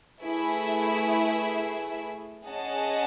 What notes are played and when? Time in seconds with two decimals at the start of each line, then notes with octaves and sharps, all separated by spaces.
0.21 A3 E4 G#4 B4 E5
2.47 C#4 G#4 D#5 F#5 A5